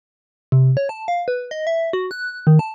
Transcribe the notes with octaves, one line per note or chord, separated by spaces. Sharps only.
C3
C#5
A5
F5
B4
D#5
E5
F#4
F#6
D#3
A5